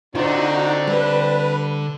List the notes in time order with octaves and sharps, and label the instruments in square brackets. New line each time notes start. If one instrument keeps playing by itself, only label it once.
[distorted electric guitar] D3 [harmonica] C4 D5 [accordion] D#4 F#4 [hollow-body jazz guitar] F4
[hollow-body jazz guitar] G3 [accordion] B4